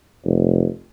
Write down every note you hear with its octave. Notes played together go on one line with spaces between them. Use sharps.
F1